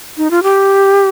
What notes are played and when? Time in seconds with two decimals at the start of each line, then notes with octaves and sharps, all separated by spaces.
0.17 D#4
0.31 F4
0.43 G4